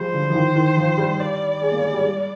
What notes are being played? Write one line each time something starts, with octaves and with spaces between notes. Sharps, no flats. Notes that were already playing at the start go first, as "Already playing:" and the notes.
Already playing: F3 G3 G#3 C5
D3
F3
D#3
D#3
F3
G3
D5
G#3
A#3
G#3
G3
G3